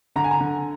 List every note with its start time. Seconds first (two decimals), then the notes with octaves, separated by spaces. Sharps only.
0.16 D3 A#5
0.24 G#5
0.31 A#5
0.40 D3